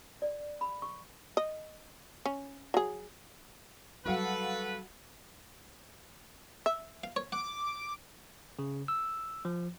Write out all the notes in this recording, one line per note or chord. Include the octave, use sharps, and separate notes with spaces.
D5
B5
C#6
D#5
C#4
F#3 G#4
F#3 G3 F#4 A4 B4 F5 F#5
E5
F5
C#5
F#5 D6
C#3
E6
F3